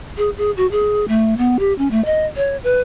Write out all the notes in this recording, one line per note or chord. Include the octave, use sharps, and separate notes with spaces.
G#4
G#4
F#4
G#4
A3
B3
G4
C#4
A3
D#5
C#5
B4